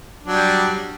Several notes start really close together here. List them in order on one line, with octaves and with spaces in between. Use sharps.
D4 F#3 G3